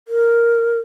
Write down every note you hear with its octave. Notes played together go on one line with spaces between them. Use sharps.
A#4